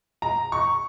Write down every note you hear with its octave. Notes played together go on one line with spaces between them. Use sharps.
A#5
C#6